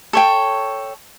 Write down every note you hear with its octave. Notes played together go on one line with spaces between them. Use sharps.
A4 C#5 G5